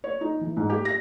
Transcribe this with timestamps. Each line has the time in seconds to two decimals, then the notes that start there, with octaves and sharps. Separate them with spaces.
0.04 C#5
0.21 D#4
0.41 E3
0.57 G#2
0.70 G4
0.85 A#6